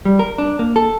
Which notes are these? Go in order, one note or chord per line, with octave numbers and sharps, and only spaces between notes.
G3
A#4
D4
A#3
A4